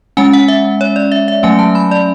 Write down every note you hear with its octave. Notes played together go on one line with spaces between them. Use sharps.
G#3 C#4 G#5
F#5
E5
C#5
D5
E5
E5
F#3 A3 C#4 G#5
A5
B5
D5